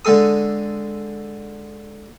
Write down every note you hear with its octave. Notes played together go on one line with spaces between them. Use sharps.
D3 G#3 G#4 A4 D#6